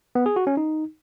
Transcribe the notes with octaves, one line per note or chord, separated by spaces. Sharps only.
B3
G#4
F#4
C#4
D#4